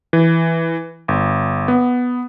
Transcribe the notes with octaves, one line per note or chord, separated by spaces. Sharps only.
E3
G1
B3